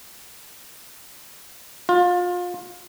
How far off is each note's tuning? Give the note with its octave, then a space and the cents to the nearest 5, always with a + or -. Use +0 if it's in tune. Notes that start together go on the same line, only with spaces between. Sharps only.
F4 +30